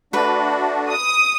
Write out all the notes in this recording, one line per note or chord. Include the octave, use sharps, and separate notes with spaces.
A3 D4 F#4 B4 B5
D#6